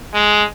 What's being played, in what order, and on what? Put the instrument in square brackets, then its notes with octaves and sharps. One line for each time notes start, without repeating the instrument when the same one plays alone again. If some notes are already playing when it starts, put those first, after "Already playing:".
[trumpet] G#3